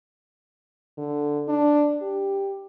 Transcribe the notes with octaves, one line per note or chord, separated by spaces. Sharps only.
D3
D4
G4